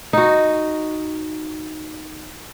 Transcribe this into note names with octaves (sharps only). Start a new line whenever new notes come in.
D#4 F#4